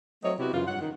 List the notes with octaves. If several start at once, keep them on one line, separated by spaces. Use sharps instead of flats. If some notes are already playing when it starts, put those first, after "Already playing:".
F#3 A3 C4 C#5 D#5
C3 B3 E4 F#4 G4
F#2 C#3 E3 F4
G2 F#3 F#5
D#3